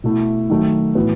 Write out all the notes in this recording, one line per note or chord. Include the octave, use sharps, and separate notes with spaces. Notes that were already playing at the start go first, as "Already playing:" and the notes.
B2 A3 E4
D#3 F#3 A3 D#4 F#4
A2 E3 B3 F#4